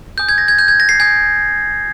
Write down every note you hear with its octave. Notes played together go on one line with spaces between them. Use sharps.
G#5 D#6 G6
G#6
A#6
G#6
G6
G#6
A#6
C7
G#5 D#6 G6 G#6